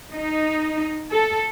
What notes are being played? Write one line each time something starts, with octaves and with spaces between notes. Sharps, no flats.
D#4
A4